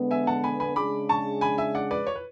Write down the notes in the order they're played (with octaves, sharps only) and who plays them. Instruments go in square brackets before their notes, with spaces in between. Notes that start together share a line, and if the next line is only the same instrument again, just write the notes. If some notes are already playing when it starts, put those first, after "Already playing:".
Already playing: [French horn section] D3 G#3 B3
[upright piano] E5 G#5
F#5 A5
G#5 B5
G#5 B5
[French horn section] C#3 G#3 D4 G#4 [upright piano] B5 D6
[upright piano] A5 C#6
G#5 B5
E5 G#5
D5 F#5
B4 D5
C#5
B4